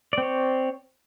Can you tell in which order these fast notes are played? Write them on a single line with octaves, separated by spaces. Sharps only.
D5 C4 C#5